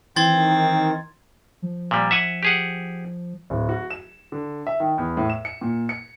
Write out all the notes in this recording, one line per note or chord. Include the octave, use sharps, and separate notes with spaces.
D#3 E3 C4 C6 G#6 A6
F3
A#2 G3
E5 F#5 G#5
G4 G#4 F#5
D1
F#4
E7
D3
E5
D#3
E2
A2
E7
C#7
A#2
C#7